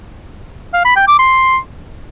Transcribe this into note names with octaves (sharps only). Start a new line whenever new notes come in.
F5
B5
G5
D6
C6